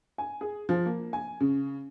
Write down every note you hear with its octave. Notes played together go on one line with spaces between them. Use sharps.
G#5
G#4
F3
A#3
G#5
C#3